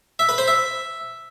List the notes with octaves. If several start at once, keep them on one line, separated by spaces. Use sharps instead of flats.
E5
B4
C5
E5